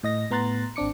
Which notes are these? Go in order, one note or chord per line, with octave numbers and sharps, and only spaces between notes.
A2 D#5 A#6
A2 B3 A#5 C6 F#6 A6
G#1 C4 D4 D6 C#7